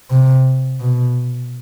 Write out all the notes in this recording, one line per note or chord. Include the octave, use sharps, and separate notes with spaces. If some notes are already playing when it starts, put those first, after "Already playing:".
C3
B2